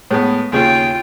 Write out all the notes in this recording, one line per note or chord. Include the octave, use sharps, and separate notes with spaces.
A2 G#3 B3
D#2 C#3 F4 G#4 G5